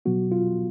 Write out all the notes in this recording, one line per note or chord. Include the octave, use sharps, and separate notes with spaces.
B2 F#3 B3 F#4
F4